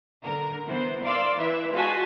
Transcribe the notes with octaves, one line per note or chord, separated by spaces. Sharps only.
D3 A#4
E3 B3 C5
A#4 D5 F5 C6 D6 E6
E3 E5
G#3 F4 F#4 G#5 A5 B6